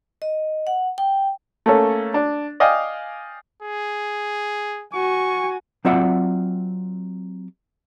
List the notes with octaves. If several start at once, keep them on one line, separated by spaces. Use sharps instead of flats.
D#5
F#5
G5
A3 A#3 C#4 A4
D4
D5 D#5 F5 G5 G#5
G#4
F#4 G#5 C#6
F#3 C4 F4 D5 E5 F#5